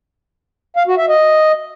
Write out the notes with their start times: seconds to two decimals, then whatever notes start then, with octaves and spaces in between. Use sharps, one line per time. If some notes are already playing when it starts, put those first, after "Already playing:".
0.76 F5
0.87 F#4
0.98 E5
1.09 D#5